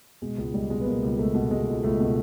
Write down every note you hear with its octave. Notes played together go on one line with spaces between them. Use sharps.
B2 G#3
C#2 G#3
C#2 G3
B2 G#3
B3
B2 A#3
C#2
C#2 A3
B2
B2 G#3
C#2
C#2 A3
B2